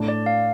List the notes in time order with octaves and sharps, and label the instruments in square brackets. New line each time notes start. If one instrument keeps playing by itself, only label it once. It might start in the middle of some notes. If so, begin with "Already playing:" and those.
Already playing: [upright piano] A2 A3 D4 A4
[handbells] D5
F5